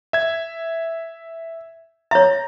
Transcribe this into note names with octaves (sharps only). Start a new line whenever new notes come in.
E5 G#6
C#5 E5 A#5